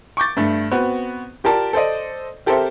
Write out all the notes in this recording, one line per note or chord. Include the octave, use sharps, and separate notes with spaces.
C#6 D6 G6 A6
G2 A3
B3 C4 F#4
F4 G4 A#4 D5 A5
A4 C5 D5 D#5
C4 G4 A4 A#4 C5 E5